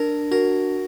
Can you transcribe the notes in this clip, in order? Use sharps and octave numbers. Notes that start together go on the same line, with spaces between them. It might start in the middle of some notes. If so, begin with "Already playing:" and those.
Already playing: D4 A#4
F#4 A#4